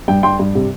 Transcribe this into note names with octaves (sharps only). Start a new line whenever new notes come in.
G2 G5
G2 G5 C6
G2
C3